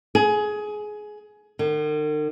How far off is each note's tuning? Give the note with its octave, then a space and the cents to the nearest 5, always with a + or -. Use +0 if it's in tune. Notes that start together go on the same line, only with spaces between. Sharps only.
G#4 +20
D#3 -45